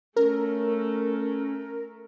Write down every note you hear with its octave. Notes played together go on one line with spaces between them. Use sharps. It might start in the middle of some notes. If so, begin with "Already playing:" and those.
A3 C#4 A#4